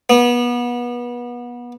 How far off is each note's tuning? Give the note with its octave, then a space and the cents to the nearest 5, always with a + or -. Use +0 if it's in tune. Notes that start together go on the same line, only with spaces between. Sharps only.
B3 -30